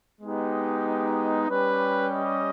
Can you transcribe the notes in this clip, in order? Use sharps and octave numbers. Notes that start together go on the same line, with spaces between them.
G#3 B3 D#4 G4
G3 C#4 G4 B4
D#5